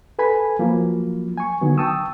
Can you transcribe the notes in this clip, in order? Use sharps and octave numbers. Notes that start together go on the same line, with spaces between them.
A4 B4 G#5 B5
F3 F#3 A#3
G#5 C#6
D3 D#3 F#3 B3
G5 A5 C#6 D#6 E6